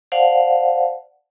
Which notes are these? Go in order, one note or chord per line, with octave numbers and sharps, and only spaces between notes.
C5 D5 F5 F#5 A5